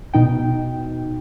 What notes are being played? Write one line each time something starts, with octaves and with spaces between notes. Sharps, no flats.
B2 D#4 G5